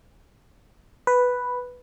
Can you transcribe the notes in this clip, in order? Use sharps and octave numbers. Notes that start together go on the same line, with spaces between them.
B4